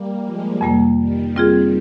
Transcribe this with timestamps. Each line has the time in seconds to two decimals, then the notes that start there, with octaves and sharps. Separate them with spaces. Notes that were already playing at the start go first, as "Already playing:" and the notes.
Already playing: G3 A#3
0.24 F3 G#3
0.61 F2 C3 G3 A#3
0.98 D#3 G3
1.36 G3 C4 F4 G#4